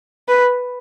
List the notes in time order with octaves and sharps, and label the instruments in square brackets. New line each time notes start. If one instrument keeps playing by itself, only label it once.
[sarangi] B4